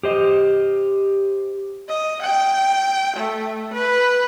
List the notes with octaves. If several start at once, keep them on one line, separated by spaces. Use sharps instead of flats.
G4 C5 D#5
D#5
G5
A3
B4